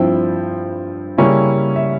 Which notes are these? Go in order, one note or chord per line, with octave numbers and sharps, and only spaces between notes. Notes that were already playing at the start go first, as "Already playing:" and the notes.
Already playing: G2 F3 C4 E4 G5
C#3 G3 A#3 C#4 E4
E5